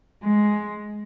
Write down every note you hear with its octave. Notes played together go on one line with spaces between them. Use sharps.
G#3